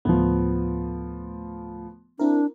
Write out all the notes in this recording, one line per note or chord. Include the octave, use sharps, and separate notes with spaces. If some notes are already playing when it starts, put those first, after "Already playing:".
D2 A2 F3 A3 B3
C4 D4 E4 A#4